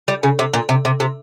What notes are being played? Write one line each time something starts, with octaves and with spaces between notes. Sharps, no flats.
G3
C#3
C3
A#2
C3
C3
C3